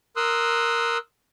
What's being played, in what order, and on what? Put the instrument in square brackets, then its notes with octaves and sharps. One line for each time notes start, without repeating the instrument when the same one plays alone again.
[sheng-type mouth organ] A#4 C6 D#6 E6 F#6